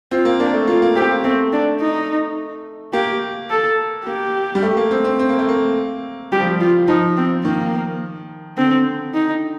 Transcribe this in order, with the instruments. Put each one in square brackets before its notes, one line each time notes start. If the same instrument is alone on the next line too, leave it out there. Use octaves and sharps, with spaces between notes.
[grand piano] C4 [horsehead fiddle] F4
[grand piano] A#3
[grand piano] A#3 [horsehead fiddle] D4
[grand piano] A3
[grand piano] A#3 [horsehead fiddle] F4
[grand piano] A#3
[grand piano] C4 [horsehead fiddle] G4
[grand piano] A#3
[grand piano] A3 [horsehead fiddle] C4
[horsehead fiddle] D4
D#4
[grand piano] A#3 [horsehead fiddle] G4
[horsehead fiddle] A4
[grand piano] A#3 [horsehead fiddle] G4
[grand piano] G3
A3
A#3
C4
C4
C4
A#3
A3
A#3
[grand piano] G3 [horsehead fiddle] G4
[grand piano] F3
G3
[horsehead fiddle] F4
[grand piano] F3 [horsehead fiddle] D#4
[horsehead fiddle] C4
[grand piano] D#3 [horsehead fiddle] A#3
[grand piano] D3 [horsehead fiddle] C4
[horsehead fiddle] D#4